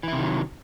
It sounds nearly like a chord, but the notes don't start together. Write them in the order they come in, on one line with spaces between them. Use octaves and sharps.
E3 E4 C3 D#3 F#3